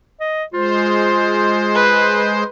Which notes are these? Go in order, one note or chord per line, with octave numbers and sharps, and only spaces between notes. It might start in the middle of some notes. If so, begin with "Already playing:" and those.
D#5
G#3 F4 C5
B4